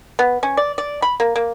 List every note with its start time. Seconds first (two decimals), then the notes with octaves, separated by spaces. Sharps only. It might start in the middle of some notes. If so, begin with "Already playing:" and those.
0.19 B3
0.43 C#4
0.57 D5
0.78 D5
1.02 B5
1.20 A#3
1.36 A#3